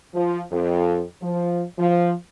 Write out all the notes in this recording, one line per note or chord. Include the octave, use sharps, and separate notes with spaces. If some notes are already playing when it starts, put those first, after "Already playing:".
F3
F2
F3
F3